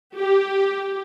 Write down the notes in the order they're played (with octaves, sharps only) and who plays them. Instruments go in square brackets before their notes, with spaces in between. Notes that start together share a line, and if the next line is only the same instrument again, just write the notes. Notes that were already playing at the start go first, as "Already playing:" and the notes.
[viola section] G4